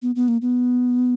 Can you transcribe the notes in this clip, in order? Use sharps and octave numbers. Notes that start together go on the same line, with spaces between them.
B3
B3
A#3
B3